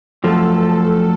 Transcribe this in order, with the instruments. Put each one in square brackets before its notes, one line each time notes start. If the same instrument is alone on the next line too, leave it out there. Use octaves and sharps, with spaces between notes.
[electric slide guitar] F#2 F3 A3 [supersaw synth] A4